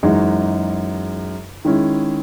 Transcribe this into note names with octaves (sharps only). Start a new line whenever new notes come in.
F#2 E3 G#3 D#4 F#4
D#3 G#3 C#4 E4